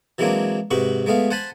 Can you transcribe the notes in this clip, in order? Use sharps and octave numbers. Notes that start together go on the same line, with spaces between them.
E3 F#3 G#3 A#3 C4 D4
G#2 C3 F#4 B4 C#6
G#3 A3 B3 F5
C5 F#5 G#5 A5 B5